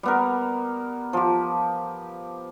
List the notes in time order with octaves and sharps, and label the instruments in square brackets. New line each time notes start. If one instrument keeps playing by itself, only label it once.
[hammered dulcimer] G3 B3 A#4
F3 G4